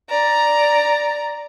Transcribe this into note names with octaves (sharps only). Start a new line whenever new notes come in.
D5 A#5